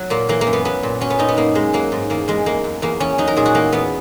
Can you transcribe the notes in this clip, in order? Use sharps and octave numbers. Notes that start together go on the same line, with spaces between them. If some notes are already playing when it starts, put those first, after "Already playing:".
Already playing: F#3
A#2 A#3
E3 A#3
A#3
F#2
B3
F#3 B3
A#2
F#3 C#4
B3
A#2 D#4
B3
F#2 A#3
F#2 G#3
F#3 A#3
G#2
E2 A#3
E2 G#3
F#2 A#3
F#2
E2 A#3
E2 C#4
F#3 D#4
A#4
A#2 G#4
F#4
E2 A#3
E2 B3